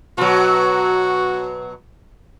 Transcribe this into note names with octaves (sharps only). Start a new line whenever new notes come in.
B2 F#3 F#4